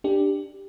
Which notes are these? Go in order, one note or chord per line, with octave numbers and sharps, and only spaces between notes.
D4 G4